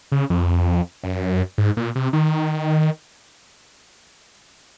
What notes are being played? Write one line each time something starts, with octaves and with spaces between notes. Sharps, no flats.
C#3
F2
F#2
G#2
A#2
C3
D#3